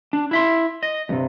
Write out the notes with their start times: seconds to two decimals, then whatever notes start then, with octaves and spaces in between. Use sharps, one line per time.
0.13 D4
0.31 E4 E5 C6
0.83 D#5
1.09 E2 G2 C3